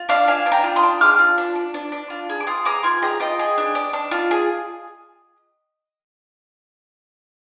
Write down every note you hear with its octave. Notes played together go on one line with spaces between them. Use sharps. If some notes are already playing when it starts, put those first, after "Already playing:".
Already playing: F4
D4 D5 F5
D4 F5 G#5
D4
G5 A#5
F4
C6 D#6
D4
G#4 D6 F6
F4
D4
D4
D4
D4
F4
G#4
D6
F4 C6 D#6
G#4 A#5 D6
F4 G#5 C6
G#4 G5 A#5
F4 D#5 G5
G#4
D4
D4
D4
F4
G#4